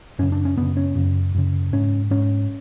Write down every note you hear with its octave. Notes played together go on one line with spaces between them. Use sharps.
F#2 C#3 C#4
D4
C#4
F#2 C#3 B3
C#4
F#2 C#3
F#2 C#3
G#2 C#4
G#2 C#4